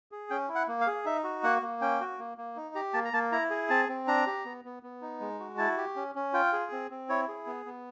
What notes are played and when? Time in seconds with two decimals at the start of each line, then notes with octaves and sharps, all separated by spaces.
0.12 G#4
0.30 C#4 G5
0.49 E4
0.55 F#5
0.68 A#3
0.81 F5
0.87 G#4
1.05 D#4 E5
1.24 F#4
1.43 A#3 F#5
1.62 A#3
1.81 C#4 G5
2.00 F#4
2.19 A#3
2.38 A#3
2.56 D#4
2.75 G4 A#5
2.94 A#3 A5
3.05 A#5
3.13 A#3 A5
3.32 E4 A#5
3.50 G#4
3.70 C4 A5
3.89 C4
4.08 D4 A#5
4.27 G4
4.45 B3
4.65 B3
4.83 B3
5.02 D#4
5.20 G#3
5.40 F#4
5.58 E4 A5
5.78 G4
5.96 C#4
6.15 C#4
6.33 F4 G5
6.53 G#4
6.72 C4
6.91 C4
7.09 E4 C#5
7.28 G#4
7.47 B3
7.66 B3